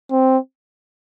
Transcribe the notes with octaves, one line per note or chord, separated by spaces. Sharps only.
C4